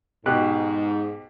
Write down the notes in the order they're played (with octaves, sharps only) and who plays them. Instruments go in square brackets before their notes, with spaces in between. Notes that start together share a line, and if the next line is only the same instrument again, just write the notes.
[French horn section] G#2 [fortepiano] B2 G4 F#6